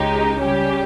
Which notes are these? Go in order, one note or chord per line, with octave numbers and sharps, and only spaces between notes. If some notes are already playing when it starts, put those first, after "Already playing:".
Already playing: C#2 C#3 G#3 D#4 G4
C#3 G3 C#4 G4